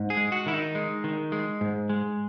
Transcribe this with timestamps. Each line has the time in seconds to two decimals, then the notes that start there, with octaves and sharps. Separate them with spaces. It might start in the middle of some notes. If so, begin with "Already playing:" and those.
Already playing: G#2
0.10 G#4
0.17 G#3
0.32 F#4
0.46 D#3 E4
0.54 D#4
0.75 G#3
1.04 D#3
1.32 G#3
1.61 G#2
1.89 G#3